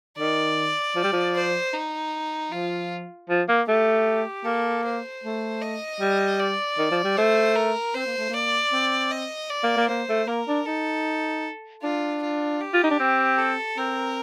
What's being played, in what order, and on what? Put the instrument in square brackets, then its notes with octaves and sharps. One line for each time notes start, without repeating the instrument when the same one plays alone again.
[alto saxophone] D#3 [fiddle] D5
[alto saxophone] F3
G3
F3
[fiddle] C5
D#4
[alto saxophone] F3 [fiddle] F4
[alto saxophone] F3
A#3
[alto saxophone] A3 [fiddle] G4
[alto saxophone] A#3 [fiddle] A4
[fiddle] C5
[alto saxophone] A3
[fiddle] D#5
[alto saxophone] G3
[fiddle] D5
[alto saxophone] D#3
F3
G3
[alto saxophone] A3 [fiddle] C5
[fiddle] A#4
[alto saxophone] C4 [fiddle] C5
[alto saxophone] A#3
A3
[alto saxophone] A#3 [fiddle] D5
[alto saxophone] C4
[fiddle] D#5
D5
[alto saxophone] A#3
A#3
[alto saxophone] A#3 [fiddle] C5
[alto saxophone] A3
[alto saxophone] A#3 [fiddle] A#4
[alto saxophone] D4
[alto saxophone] D#4 [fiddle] A4
[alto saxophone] D4 [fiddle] F4
[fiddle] F4
G4
[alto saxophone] F4
D#4
D4
C4
[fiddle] A4
[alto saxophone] C4 [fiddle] A#4